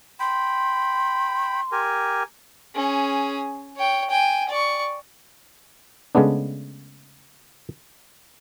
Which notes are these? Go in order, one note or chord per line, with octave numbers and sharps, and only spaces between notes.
G5 B5 C6
G4 A#4 G#5
C#4 G#4
C#5 G5
G5 G#5
D5 C#6
C#3 G#3 A3 B3 D4